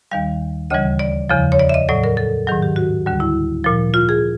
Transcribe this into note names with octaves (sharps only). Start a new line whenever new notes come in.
D#2 D#3 G3 F5
D2 C#3 E3 G3 D#5
D5
E2 C#3 F3
C#5
D5
E5
D#5
A2 F#3 D5
A#4
A4
G#2 D#3 F#3 G#4
G4
F#4
D2 D3 G3
E4
A#2 F3
F4
G#4